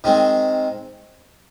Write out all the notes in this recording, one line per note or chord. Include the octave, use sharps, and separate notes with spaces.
D#3 G#3 C4